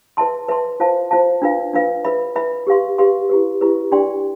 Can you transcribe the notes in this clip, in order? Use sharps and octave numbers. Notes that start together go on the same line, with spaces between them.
B4 E5 A5 C6
B4 E5 A5 C6
F4 C5 F5 A5
F4 C5 F5 A5
D4 F4 B4 F5
D4 F4 B4 F5
B4 E5 B5
B4 E5 B5
G4 B4 F5 C6
G4 B4 F5 C6
E4 G4 B4
E4 G4 B4
D4 G4 D5 G5 C6